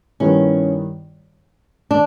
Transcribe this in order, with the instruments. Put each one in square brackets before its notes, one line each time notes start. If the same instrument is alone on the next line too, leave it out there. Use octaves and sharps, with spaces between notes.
[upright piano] G2 D#3 G3 B3 E4 [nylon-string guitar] C#4
[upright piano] D#3 [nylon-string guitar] D4